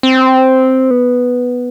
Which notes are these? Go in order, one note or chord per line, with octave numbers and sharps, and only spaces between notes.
C4
B3